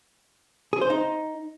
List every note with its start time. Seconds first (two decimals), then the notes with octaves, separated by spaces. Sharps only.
0.73 G#4
0.81 C5
0.90 D#4